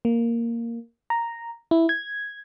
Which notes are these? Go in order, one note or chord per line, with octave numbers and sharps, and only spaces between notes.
A#3
A#5
E4
G#6